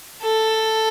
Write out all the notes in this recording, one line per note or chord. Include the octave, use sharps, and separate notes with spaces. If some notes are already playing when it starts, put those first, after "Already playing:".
A4